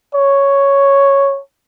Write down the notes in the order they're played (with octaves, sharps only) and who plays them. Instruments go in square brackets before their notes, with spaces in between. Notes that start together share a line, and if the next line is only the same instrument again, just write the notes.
[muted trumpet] C#5